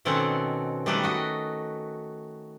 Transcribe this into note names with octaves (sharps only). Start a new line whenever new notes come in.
B2 D#3 C4 C#4 A4 F#5
D#3 G3 A3 G4 A4 B4
F#4 D#5